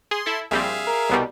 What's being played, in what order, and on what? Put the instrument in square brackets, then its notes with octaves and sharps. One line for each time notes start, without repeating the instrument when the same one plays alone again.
[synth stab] G#4 [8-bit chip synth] C6
[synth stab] E4 A4
[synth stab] A#1 G3 C4 [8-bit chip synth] G#4 E5 F5
[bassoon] A#4
[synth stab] C2 B2 G3